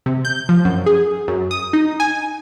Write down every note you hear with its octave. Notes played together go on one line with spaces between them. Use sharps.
C3
G6
F3
F#2
G#4
F#2
D#6
D#4
G#5